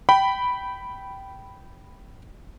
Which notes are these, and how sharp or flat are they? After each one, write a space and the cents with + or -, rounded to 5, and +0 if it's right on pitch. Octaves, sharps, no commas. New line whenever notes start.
G5 -15 B5 +0